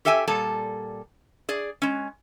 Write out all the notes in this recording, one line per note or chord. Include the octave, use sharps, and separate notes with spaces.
G4 A4 E5 G5 G#5
A#2 G3 A4 A5
G#4 D5
G#3 C#4